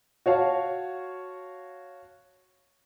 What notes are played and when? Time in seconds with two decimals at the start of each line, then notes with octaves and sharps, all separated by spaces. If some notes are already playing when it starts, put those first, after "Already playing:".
0.26 F#4 C#5 F5 A5